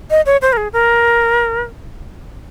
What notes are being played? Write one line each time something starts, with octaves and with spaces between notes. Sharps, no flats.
D#5
C#5
C5
A#4
G#4
A#4